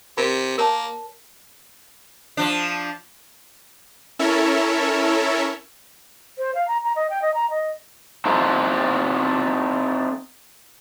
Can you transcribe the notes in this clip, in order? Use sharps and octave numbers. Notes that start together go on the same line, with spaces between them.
C3 A#4 B5
A#3 A#4 C#5 A5
F3 D4
C#4 E4 A4 A#4 C#5 E5
C5
F5
A#5
A#5
D#5
G5
D#5
A#5
D#5
C4 D#4 E4 A4 C5